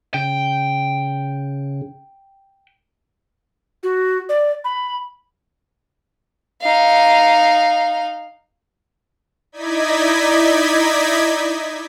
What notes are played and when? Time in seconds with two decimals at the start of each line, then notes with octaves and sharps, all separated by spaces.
0.14 C#3 G5
3.83 F#4
4.29 D5
4.65 B5
6.61 D#4 F5
9.52 D#4 E4 D5 D#5 G#6 B6